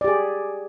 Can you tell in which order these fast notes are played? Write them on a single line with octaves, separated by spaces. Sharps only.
D5 G4 G#4